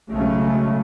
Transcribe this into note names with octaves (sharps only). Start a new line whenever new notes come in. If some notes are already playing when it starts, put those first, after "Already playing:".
B1 C#3 F#3 G#3 A3 C#4